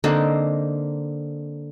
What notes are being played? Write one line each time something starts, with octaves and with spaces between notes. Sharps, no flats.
D3 A#3 C4 D#4